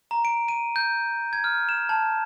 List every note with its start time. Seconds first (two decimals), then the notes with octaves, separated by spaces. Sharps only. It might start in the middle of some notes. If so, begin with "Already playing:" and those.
0.11 A#5
0.25 D7
0.48 D#7
0.76 G6
1.33 G#6
1.44 F6
1.69 E7
1.89 A5